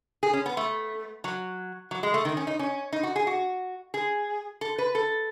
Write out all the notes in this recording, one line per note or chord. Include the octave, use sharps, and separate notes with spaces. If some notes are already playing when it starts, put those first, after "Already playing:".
G#4
C#4
B3
A3
F#3
F#3
G#3
A3
D#3
C#4
D#4
C#4
D#4
F#4
G#4
F#4
G#4
A4
B4
A4